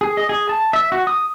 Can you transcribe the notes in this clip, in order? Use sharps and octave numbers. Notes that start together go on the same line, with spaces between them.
G#4
D#5
G#4
A5
E5
F#4
D#6